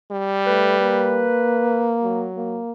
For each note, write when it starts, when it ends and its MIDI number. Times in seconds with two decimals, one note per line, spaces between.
0.11 1.34 55
0.47 0.78 57
0.47 1.99 71
0.80 2.29 58
2.03 2.59 54
2.37 2.72 58